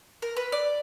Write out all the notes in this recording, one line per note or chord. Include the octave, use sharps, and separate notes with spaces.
A#4
B4
D5